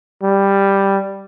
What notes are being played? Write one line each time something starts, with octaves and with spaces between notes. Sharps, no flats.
G3